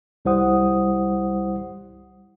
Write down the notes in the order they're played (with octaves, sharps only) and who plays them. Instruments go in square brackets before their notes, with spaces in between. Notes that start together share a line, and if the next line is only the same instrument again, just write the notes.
[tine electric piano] C2 G3 E4 C5 F#5 D#6